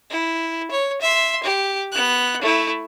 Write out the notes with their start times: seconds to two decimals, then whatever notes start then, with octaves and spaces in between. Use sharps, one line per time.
0.10 E4
0.71 C#5
1.02 E5 C6
1.43 G4
1.92 B3 F#6
2.42 A3 E4